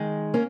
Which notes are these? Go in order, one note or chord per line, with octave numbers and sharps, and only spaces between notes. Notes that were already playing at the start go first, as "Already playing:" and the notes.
Already playing: D#3 G#3
A#3 C#4